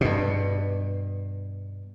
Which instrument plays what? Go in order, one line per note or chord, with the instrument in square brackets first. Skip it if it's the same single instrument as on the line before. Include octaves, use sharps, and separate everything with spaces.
[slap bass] G2 B2